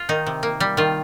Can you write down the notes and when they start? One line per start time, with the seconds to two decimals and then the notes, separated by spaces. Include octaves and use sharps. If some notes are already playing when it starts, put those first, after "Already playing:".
Already playing: F4
0.09 D#3 D#4
0.27 C3
0.43 A#3
0.60 G3
0.77 D#3 F4